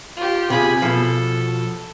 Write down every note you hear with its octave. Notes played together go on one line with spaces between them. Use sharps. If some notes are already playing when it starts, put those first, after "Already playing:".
F4 G4
C3 F4 G#4 G#5 B5
B2 F3 A4